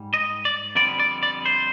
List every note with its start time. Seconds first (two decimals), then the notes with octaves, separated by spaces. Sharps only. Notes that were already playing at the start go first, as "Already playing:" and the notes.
Already playing: G#2 G3
0.14 D#5
0.45 D5
0.75 F2 D3 G3 B3 D5
1.00 D5
1.23 D5
1.45 C5